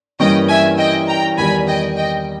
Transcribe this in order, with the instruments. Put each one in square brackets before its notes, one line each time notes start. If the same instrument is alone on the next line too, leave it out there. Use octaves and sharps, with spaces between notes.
[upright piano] G2 E3 G3 A#3 C#4 [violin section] D#5 G5
[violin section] E5 G#5
D#5 G5
G5 A#5
[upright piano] E2 D#3 G3 [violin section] G#5 B5
[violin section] D#5 G5
D#5 G5